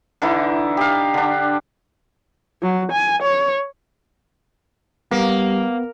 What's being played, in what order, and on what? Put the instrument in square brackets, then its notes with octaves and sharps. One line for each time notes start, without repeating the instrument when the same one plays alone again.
[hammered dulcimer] D3 E3 D#4 E4
G4 F5
D3 D4
[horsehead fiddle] F#3
G#5
C#5
[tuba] G3 [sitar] A#3 [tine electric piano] B3